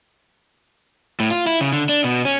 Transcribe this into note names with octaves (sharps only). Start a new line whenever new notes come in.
A2
F4
E4
C#3
D3
D4
B2
C#4